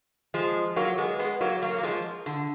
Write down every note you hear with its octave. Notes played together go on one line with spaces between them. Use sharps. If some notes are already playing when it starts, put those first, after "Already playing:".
F3 G#3
F#3 A#3
G#3 B3
G#3 B3
F#3 A#3
F#3 A#3
A#3
F3 G#3
D3